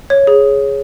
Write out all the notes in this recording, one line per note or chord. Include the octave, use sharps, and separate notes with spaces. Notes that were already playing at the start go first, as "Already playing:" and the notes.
C#5
G#4